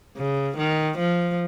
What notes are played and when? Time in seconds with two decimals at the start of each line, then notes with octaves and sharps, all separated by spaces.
0.17 C#3
0.58 D#3
0.98 F3